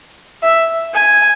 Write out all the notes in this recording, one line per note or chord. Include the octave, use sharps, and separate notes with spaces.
E5
G#5